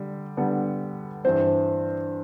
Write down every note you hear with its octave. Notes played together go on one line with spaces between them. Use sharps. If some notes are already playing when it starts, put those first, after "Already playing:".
Already playing: D3 G3
D3 G3 B3
G2 E3 G3 C4 C5